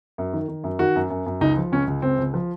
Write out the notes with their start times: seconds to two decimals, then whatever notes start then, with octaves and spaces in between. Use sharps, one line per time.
0.18 F#2
0.33 D#3
0.48 D#3
0.64 F#2
0.79 D#3 F#4
0.96 F#2
1.10 F#2
1.26 F#2
1.41 C#2 D#4
1.57 F3
1.72 C#2 C#4
1.87 C#2
2.02 C#2 C4
2.18 C#2
2.34 F3